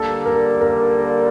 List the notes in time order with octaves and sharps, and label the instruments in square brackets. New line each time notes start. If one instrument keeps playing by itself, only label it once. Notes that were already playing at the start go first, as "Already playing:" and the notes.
Already playing: [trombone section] D3 G3 A#3 [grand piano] A4
[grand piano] A#4
A#4